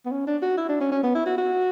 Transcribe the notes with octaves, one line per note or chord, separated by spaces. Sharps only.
B3
C#4
D4
F#4
E4
D4
C#4
C#4
B3
E4
F#4
F#4